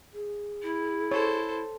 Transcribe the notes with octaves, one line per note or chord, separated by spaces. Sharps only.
G#4
E4
A4 C5 C#5